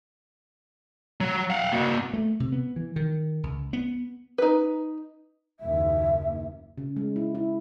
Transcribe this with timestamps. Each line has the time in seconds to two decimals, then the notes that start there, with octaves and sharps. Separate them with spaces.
1.21 F#3
1.50 F5 F#5
1.72 A#3 F#4
2.13 A3
2.40 C3
2.52 B3
2.76 E3
2.96 D#3
3.43 C#2
3.73 B3
4.38 D#4 B4
5.60 F#1 D#2 E5
6.78 C#3
6.97 G#3
7.16 E4
7.35 E4